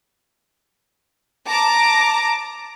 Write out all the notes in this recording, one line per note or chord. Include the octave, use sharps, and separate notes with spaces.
A5 A#5 D6